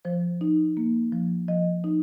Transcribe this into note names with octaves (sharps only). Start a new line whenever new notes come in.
F3 C5
D#4
A#3
F3
F3 D#5
D#4